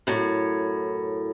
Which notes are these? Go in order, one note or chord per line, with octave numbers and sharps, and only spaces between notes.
F#2 A2 C#5